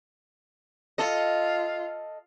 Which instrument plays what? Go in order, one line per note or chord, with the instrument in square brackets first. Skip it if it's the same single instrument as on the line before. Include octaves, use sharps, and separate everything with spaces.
[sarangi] F4 [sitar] A4 D#5